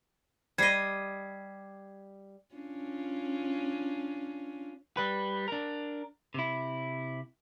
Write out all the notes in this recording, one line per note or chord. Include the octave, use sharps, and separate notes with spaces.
G3 D#5 G#6 C7
C#4 D4 F4
G3 B4
D4 A#4
C3 E4